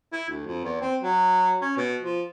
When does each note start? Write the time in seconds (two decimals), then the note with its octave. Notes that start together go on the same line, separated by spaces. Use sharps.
0.13 E4
0.29 D2
0.46 F2
0.64 E2
0.81 C4
1.03 F#3
1.61 C#4
1.77 B2
2.01 F3